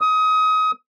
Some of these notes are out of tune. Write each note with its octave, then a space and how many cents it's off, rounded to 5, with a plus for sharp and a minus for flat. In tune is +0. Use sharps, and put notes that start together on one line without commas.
D#6 +25